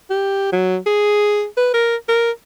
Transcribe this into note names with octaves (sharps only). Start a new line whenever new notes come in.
G4
F#3
G#4
B4
A#4
A#4